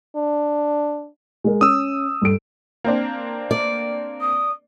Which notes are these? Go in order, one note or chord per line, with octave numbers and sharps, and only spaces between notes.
D4
G#3 A#4
C#4 D#6 E6
G2 A4 D7
A#3 C4 D4
D5
D#6